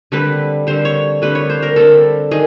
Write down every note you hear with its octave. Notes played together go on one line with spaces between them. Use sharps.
D3 G3 C4 B4
D3 G3 C4 C5
C#5
D3 G3 C4 B4
C#5
C5
A#4
D3 G3 C4 A4
D#3 G#4